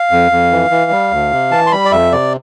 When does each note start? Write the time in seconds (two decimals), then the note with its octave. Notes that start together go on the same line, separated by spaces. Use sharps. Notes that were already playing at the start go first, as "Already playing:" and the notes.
Already playing: F5
0.11 F2
0.31 F2
0.52 E3
0.71 E3
0.91 G3
1.11 D2
1.32 C3
1.51 E3 A5
1.66 C6
1.72 G3 B5
1.85 D5
1.92 F2 E5
2.12 C3 D5